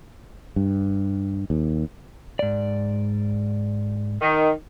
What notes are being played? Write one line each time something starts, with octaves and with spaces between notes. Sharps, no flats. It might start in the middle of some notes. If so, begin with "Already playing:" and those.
G2
D#2
G#2 D5
D#3